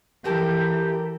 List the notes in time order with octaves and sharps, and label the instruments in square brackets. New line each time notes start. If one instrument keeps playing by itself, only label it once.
[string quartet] E3 [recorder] G4 [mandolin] A4 A#4 G5